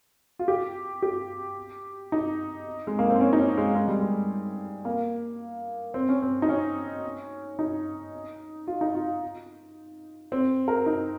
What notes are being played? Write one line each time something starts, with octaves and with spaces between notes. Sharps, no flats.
F4
G4
G4
D#4
G#3
A#3
C4
C#4
D#4
C#4
G#3
G#3
G3
G#3
A#3
C4
C#4
C4
D#4
C#4
D#4
F4
D#4
F4
C4
A#4
D#4